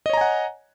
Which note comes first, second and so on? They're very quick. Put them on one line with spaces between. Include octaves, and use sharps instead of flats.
D#5 C#5 A#5 G#5 F#5